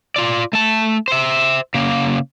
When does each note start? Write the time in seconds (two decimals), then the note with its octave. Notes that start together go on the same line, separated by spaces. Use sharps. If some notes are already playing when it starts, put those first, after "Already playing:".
0.16 F4 D5
0.53 A3 A5
1.08 C5 E5
1.74 C#3 A#3